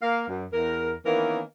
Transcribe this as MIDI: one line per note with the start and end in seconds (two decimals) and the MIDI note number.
0.02 0.24 58
0.02 0.24 77
0.28 0.45 42
0.53 0.93 40
0.53 0.93 70
1.05 1.40 51
1.05 1.40 52
1.05 1.40 58
1.05 1.40 59
1.05 1.40 61
1.05 1.40 70